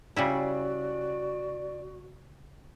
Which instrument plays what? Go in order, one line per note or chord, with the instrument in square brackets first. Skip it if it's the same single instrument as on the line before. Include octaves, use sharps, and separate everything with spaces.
[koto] C#3 G3 E4 [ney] F#4 [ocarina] D5